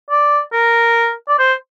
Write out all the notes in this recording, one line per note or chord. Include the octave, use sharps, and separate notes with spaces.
D5
A#4
D5
C5